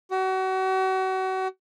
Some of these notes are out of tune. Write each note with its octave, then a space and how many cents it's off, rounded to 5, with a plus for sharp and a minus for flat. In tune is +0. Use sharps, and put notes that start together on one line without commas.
F#4 +35